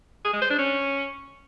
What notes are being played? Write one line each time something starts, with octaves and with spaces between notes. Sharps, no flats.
G#4
G#3
C5
D4
C#4